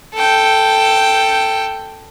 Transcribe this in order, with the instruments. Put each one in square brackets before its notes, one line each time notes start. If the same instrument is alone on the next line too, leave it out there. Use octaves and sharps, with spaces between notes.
[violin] A4 G5